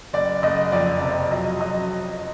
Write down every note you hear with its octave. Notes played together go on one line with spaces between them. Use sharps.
F#1 D5
F#1 D#5
F2 D5
C3 D5
F#3 D#5
F#3 D#5